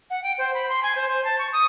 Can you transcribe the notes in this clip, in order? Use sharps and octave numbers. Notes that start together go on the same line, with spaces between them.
F#5
G5
C5
B5
C6
G#5
C5
C5
A5
C#6
D#6